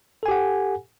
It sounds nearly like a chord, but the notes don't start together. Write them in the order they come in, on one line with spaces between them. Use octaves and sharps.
A4 G#5 G4 F#5